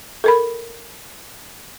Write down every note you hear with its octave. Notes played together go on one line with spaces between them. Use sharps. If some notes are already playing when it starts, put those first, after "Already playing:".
A4 A#4 B5